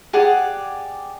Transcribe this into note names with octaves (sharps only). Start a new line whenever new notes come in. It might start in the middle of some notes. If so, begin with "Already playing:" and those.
G4 G#4 D5 F#5